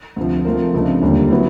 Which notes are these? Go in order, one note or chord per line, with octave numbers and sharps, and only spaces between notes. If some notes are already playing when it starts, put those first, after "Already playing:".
D2 C3 F3
F3 A3 C4 F4 A#4
C#2 C3 F3 A3 D4
D#2 D3 G3 A#3
F#3 B3 E4